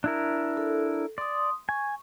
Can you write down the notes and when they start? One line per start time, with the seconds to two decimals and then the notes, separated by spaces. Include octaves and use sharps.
0.04 D4 E4 A#4
0.57 A4
1.18 D5 C6 D#6
1.69 G#5 C#6